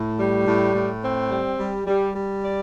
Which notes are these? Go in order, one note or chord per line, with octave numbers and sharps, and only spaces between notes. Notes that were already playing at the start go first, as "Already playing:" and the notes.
Already playing: A2
G3
A2
A2
C4
G3
G3
G3
G3
D5